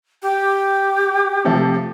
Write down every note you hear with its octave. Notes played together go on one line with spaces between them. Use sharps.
G4
C3 F3 A3